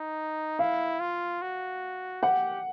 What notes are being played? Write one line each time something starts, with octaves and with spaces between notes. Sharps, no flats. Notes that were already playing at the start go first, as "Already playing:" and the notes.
Already playing: D#4
E4 F5
F4
F#4
G4 F#5